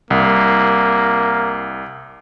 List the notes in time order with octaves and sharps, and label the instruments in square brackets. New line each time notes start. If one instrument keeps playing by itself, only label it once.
[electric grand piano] C2 [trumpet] A#3